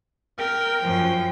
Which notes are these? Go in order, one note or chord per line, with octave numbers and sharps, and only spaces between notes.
A#4 G5
F#2 F3